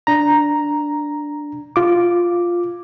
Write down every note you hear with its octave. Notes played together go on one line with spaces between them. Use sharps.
D4 A#5
F4 D6